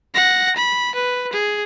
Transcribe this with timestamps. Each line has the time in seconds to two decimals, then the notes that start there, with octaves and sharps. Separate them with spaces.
0.14 F#5 A#6
0.56 B5
0.95 B4
1.33 G#4